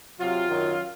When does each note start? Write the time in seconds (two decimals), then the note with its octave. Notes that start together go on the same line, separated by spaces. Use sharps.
0.19 C3 F#3 F4
0.49 F#2 D#3 F#3